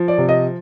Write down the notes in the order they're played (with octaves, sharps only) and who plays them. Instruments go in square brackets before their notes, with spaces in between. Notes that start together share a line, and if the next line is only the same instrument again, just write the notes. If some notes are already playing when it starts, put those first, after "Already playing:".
Already playing: [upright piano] F3
D5
C3
D#5